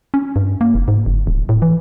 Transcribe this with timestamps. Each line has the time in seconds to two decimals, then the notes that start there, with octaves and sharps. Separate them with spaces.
0.14 C#4
0.36 G2
0.61 A#3
0.74 F1
0.88 G#2
1.06 F#1
1.27 D1
1.49 A2
1.62 E3